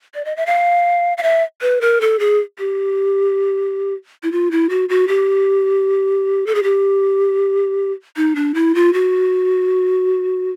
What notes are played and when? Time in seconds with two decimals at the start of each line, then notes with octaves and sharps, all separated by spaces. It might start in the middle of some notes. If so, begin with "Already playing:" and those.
0.15 D5
0.25 D#5
0.37 E5
0.46 F5
1.18 F5
1.23 E5
1.61 B4
1.81 A#4
2.01 A4
2.19 G#4
2.59 G4
4.23 E4
4.32 F4
4.51 E4
4.69 F#4
4.89 F#4
5.08 G4
6.46 A4
6.55 G#4
6.63 G4
8.17 D#4
8.36 D4
8.54 E4
8.75 F4
8.93 F#4